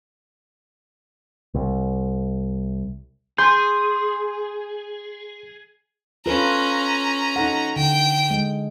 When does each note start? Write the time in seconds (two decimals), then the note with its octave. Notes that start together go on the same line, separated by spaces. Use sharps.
1.54 C2
3.38 G#4 C6 G6
6.26 C#4 F4 A4 B4 A#5
7.36 D#4 A4 F#5
7.76 D3 G5
8.31 G#3